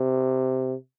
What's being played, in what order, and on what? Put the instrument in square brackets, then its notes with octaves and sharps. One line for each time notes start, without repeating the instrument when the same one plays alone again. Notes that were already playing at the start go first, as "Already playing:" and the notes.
Already playing: [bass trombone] C3